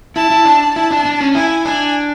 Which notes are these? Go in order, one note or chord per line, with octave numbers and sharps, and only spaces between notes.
E4 A5
E4
D4
E4 A5
D4
D4
C#4
E4 G#5
D4 G#5